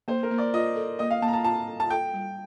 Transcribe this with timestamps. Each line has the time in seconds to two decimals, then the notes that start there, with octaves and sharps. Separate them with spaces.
0.08 A#3 C5
0.23 A#4
0.31 A#3
0.38 D5
0.54 F4 D#5
0.76 A4
0.99 A#3 D#5
1.10 F5
1.22 A#3 A5
1.28 A#5
1.33 A5
1.44 F4 A5
1.67 A4
1.80 A5
1.90 A4 G5
2.14 G3